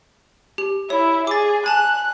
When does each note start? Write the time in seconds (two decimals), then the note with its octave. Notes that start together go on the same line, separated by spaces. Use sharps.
0.58 G4
0.90 E4 C#5
1.27 G#4 D6 A6
1.66 G#5 A5 F#6